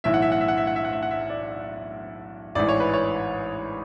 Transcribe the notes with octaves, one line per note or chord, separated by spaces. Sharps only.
B1 A2 E3 E5
F#5
E5
F#5
E5
F#5
E5
F#5
E5
F#5
E5
F#5
E5
D5
A1 G#2 E3 D5
C#5
B4
C#5